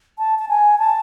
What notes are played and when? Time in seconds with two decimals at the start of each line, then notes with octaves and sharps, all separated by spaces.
0.18 A5
0.39 A5
0.49 G#5
0.79 A5